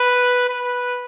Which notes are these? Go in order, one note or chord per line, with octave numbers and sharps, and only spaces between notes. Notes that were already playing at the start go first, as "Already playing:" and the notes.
Already playing: B4
B4